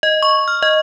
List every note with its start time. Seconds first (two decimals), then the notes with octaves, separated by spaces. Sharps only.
0.03 D#5
0.22 C#6
0.48 F6
0.62 D#5